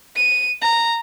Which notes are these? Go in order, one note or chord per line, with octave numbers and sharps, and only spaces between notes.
D#7
A#5